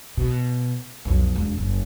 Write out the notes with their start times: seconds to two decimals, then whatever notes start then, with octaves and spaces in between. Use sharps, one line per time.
0.17 B2
1.05 B1 F2
1.36 E1 F2
1.58 F#1